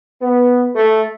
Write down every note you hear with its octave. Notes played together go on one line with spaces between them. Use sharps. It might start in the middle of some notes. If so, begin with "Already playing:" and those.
B3
A3